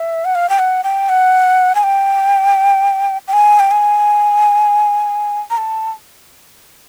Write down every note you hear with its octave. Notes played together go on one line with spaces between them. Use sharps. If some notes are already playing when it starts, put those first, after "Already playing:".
Already playing: E5
F#5
F5
G5
F#5
G5
F#5
G#5
G5
G5
G#5
G5
G#5
A#5
A5